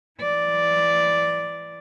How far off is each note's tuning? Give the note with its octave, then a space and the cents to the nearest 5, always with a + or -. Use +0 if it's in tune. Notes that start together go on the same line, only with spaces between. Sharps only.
E3 +25 D5 +0